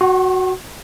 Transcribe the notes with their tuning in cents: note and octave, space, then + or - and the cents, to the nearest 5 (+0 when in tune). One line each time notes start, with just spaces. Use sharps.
F#4 +0 F#5 +40 C#6 -45